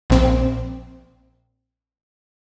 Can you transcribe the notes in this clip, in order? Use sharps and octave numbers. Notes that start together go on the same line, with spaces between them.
A#1 C4